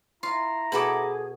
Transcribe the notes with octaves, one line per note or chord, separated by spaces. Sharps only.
E4 F4 A#5 C6
B2 F#4 G#4 A4 B5 D6